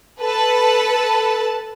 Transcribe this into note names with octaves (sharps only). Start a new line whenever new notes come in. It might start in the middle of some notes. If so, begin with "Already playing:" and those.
A4 B4 A5